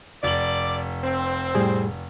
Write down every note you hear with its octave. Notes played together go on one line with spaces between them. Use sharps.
F1 D5 F#7
C4
A2 G3 G#4